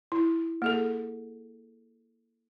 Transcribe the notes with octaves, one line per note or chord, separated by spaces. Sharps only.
E4
A#3 G#4 A4